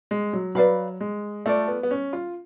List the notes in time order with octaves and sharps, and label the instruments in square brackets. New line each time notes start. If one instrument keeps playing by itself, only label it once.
[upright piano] G#3
F#3
[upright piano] F#3 [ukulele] B4 D5 F5 B5
[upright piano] G#3
[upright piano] A3 [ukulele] F4 A4 D5
[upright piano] B3
B3
C#4
F4